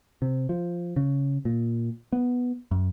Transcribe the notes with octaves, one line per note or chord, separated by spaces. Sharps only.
C3
F3
C#3
A#2
B3
F#2